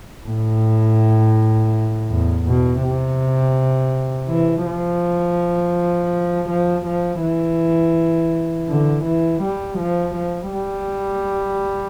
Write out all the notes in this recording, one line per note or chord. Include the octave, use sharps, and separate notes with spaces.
A2
E2
B2
C3
E3
F3
F3
F3
E3
D3
E3
G3
F3
F3
G3